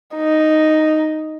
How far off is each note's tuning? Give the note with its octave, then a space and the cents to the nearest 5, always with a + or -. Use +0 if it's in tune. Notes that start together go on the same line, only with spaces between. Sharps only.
D#4 +0